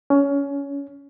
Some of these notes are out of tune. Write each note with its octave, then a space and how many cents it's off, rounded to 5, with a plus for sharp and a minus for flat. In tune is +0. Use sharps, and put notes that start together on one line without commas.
C#4 +20